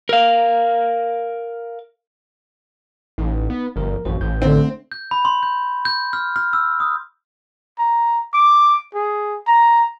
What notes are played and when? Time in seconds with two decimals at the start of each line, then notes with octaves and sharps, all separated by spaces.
0.09 A#4 F5
3.18 A1 D#4
3.50 B3
3.76 G1 F3 A#4
4.05 A1 F#2 F#4 C5
4.21 A1 G6
4.42 D3 A3 C4 D4
4.92 G6
5.11 B5
5.25 C6
5.43 G6
5.85 G6
6.13 F6
6.36 F6
6.53 E6
6.80 D#6
7.78 A#5
8.33 D6
8.95 G#4
9.47 A#5